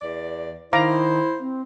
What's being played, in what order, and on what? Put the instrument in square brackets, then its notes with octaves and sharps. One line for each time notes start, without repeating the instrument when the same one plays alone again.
[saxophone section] E2 D5
[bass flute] D#3 [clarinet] E4 [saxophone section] C5 [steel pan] F5 A#5 D6
[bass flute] C4